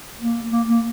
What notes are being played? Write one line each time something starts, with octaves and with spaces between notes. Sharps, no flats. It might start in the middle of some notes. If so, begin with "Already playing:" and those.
A#3
A#3
A#3